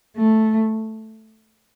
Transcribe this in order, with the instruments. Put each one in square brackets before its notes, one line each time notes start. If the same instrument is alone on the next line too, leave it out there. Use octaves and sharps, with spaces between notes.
[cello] A3